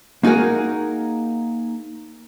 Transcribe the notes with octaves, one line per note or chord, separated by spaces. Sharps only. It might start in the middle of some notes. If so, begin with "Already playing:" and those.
A#3 D#4 F#4 G#4 A#4